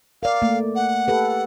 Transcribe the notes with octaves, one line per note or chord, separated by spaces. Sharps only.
A#4 D5 F5
A3 A#3
F#5
G4 A4 B4